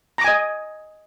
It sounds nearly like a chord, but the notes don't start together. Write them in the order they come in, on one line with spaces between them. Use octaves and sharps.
A#5 D6 G#5 D#5